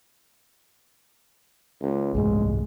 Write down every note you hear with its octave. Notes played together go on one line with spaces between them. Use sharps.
C#2
C2 G#2 G#3 A3